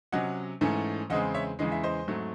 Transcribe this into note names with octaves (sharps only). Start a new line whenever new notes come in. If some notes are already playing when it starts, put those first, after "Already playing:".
C3 F#3 C#4 D#5 F#5
G#2 E3 A3 C#4
E2 C#3 G#3 C4 D#5 F#5
C#5 E5
E2 C#3 E3 G#3 D#5
E5
C5 D#5
G#2 F#3 A3 C4